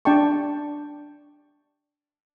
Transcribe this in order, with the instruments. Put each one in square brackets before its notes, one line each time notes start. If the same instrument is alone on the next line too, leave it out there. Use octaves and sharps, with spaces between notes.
[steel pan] D4 D5 G5 A5 C#6